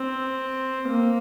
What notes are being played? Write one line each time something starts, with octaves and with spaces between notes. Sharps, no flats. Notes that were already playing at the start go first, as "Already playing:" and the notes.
Already playing: C4
A#3